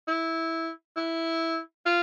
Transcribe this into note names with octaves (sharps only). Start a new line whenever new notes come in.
E4
E4
F4